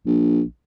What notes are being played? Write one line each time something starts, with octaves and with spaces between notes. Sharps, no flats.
A#1